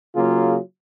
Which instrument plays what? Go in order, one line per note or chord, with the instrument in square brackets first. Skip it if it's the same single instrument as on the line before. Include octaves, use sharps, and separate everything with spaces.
[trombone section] C#3 F#3 A#3 F4 G#4